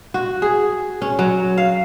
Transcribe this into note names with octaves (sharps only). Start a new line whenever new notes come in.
F#4
G#4
C#4
F#3
F5